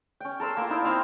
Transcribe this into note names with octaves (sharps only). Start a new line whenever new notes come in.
C#4 G5
A4 A#4 C6 E6
A#3 F4
D#4 E4 G5 E6
C4 F5 G5 E6